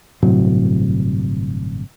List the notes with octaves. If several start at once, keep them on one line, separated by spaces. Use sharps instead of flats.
G1 A2 C3 F#3